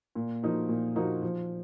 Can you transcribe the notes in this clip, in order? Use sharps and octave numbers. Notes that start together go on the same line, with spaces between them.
A#2
F3 A#3 D#4 F#4
A#2
F3 A#3 D#4 F#4
F3